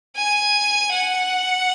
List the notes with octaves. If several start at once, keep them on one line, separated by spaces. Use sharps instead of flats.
G#5
F#5